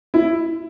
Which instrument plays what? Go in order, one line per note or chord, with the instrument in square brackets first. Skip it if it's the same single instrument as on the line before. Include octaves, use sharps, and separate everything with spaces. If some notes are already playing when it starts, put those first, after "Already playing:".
[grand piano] E4